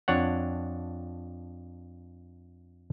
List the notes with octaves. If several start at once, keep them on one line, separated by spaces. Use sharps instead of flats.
F2 D4 C#5 F#5